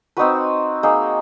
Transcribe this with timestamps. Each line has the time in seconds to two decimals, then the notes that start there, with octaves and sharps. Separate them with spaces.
0.17 C4 D#4 F#4 B4
0.83 A#3 D#4 G#4